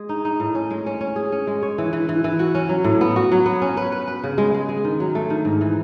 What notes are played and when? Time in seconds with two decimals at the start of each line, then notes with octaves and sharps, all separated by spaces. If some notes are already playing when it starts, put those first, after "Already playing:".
Already playing: G#3 G#4
0.09 D#4
0.25 D#4
0.40 A2
0.55 C#4
0.71 G#3
0.86 C#4
1.01 C#4
1.16 G#4
1.32 C#4
1.47 G#3
1.62 C#5
1.78 E3
1.93 E3
2.09 E3
2.24 E3
2.39 F#4
2.55 C#4
2.69 F#3
2.84 A2
3.01 B3
3.16 F#4
3.32 F#3
3.46 B3
3.62 C#4
3.77 B4
3.92 B4
4.08 B4
4.24 C#3
4.38 G#3
4.54 G#3
4.69 G#3
4.84 D#3
5.00 F#3
5.15 A3
5.30 D#3
5.45 G#2
5.61 E3